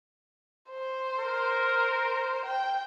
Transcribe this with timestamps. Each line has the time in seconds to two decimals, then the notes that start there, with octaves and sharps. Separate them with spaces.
0.70 C5
1.19 A#4
2.45 G5